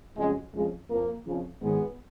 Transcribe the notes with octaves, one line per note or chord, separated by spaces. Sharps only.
F2 C#3 F#3 G#3
F2 C#3 F3 G#3
F2 F3 A#3
F2 C#3 F3
G#2 D#3 F#3 G#3 B3